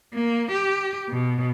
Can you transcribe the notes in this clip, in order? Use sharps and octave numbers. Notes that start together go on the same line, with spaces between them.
A#3
G4
B2